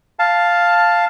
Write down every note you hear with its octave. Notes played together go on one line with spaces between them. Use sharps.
F5 A5